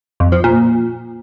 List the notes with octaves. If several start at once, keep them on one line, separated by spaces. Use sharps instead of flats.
F2
F3
A#2